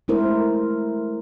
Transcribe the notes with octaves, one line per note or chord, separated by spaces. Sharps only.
G#3 A3 E4 A#4 C5